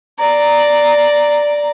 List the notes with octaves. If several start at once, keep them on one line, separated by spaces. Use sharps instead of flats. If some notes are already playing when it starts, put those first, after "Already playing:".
D5 A#5